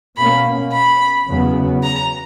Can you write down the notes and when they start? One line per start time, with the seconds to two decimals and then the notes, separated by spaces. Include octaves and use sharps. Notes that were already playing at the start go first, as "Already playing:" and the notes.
0.17 B2 A#3 C#4 B5
0.72 B5
1.27 E2 C#3 F#3 B3
1.83 A#5